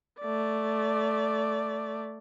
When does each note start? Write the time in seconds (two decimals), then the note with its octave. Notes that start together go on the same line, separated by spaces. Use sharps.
0.20 A3 D5